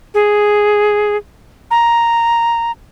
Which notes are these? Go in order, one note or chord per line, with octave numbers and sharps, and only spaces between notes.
G#4
A#5